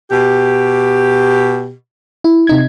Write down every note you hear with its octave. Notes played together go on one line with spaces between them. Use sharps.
B2 G4
E4
C3 D#4 G#6